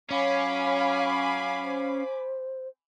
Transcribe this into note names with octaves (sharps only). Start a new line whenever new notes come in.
F#3 C#4 C#5 F5 G#5 B5 D6
C5